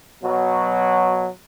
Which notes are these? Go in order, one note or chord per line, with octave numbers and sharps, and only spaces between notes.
B2 F#3